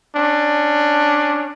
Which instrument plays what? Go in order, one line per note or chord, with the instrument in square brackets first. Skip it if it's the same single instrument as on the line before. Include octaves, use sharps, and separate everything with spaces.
[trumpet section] C#4 D4